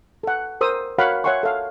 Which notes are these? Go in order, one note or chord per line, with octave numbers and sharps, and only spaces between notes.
A4 F#5
A#4 C5 D#6 E6
F#4 A#4 C#5 F5 F#5 B5
C#5 E5 F#5 G#5 C6 C#6
A4 F5